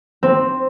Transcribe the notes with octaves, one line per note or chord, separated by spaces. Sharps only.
C4